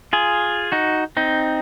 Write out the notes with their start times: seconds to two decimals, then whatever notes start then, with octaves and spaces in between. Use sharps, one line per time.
0.13 F4 G#4
0.72 D#4 F#4
1.17 C4 D#4